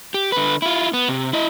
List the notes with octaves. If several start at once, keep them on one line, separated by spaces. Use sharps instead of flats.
G4
D3 B4
E4 F4
B3
C3
E4 D#5